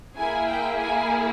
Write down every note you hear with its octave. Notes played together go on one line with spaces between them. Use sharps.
A#3 E4 G#4 G#5
G5
G#5